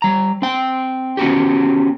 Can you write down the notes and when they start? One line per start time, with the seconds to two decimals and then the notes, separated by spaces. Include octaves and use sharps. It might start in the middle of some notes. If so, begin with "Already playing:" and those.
0.02 G3 A#5
0.42 C4 G5
1.17 B3 C#4 F#4 G4